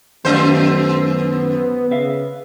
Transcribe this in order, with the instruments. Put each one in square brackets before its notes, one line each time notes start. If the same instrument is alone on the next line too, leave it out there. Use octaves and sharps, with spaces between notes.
[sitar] F#2 C5 [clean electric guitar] D#3 F#3 A3 [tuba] B3
[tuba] C#3 [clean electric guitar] B4 E5 F5